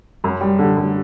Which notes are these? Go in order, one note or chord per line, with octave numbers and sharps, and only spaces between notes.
F#2
G3
D3
F#2